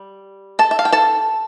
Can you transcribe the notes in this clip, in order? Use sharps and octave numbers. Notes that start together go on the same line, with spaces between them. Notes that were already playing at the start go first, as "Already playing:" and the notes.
Already playing: G3
A4 A5
E5
F5
G5
A4 A5